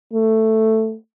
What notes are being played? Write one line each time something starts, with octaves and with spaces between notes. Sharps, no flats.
A3